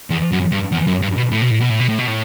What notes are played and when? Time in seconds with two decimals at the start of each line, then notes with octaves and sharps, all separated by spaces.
0.10 E2
0.32 F#2
0.52 G2
0.72 E2
0.87 F#2
1.02 G2
1.17 B2
1.32 A2
1.42 B2
1.50 A2
1.60 B2
1.70 A2
1.80 B2
1.89 A2
1.99 B2
2.08 A2